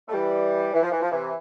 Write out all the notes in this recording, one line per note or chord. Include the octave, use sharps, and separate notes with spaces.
A3
E3 G3
E3
F3
E3
F3
C3 E3